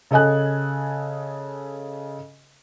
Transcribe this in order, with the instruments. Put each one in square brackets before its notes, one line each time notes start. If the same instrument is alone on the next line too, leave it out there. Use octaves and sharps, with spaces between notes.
[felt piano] C#3 A4 D#5 G#5 F#6